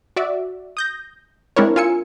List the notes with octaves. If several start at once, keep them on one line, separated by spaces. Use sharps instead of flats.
F#4 D5 E5
D#6 G6 A#6
G#3 C4 D4 E4 A#4 C#5
F4 A#4 G#5 E6 C#7